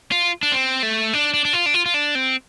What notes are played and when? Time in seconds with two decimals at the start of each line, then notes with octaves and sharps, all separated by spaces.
0.12 F4
0.43 D4
0.52 C4
0.83 A3
1.13 D4
1.34 D4
1.45 D4
1.53 F4
1.66 D4
1.74 F4
1.86 F4
1.94 D4
2.15 C4